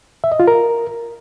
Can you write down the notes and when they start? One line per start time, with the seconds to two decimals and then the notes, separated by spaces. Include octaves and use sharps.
0.24 E5
0.32 D#5
0.40 F4
0.48 A#4